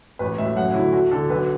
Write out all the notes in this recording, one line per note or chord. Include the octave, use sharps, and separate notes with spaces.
A1 B4
A2 E5
F#2 F#5
D3 E4
D2 F#4
D3 A4
B1 B4